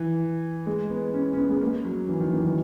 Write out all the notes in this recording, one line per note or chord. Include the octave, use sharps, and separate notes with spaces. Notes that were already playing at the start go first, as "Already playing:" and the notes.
Already playing: E3
G#3
B3
C#4
C#4
B3
G#3
A#3
F#3
E3
D#3
E3
F#3